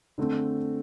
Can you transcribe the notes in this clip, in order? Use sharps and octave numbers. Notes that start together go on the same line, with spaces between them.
D3 A3 C4